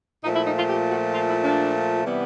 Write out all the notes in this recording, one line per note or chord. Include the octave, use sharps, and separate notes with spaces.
A#2 F3 A3 D#4
E4
D#4
F4
G4
F#4
F4
E4
D4
C3 E3 G3 B3